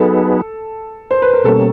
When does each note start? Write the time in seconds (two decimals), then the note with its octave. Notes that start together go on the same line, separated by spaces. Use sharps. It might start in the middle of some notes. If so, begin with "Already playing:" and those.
Already playing: F#3 B3 D#4 G#4 A4 B4
1.11 C5
1.22 B4
1.33 A#4
1.44 B2 G3 A#3 C#4 A4